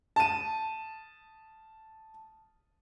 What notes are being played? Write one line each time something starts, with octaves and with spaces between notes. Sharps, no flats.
A5 D#7